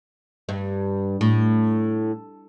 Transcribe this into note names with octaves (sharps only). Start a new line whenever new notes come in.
G2
A2